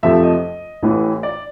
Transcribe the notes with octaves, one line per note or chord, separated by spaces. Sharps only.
F2 C3 F3 A3 C4 E5
D#5
A1 A2 E3
D5